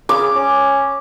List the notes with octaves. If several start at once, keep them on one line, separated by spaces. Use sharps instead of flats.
C#3 D6
C#4